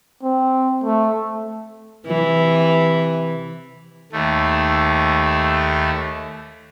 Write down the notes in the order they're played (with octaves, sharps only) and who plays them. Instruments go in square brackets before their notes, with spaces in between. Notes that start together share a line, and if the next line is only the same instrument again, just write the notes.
[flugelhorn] C4
A3
[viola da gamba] C3 E3
[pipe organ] D#2 A3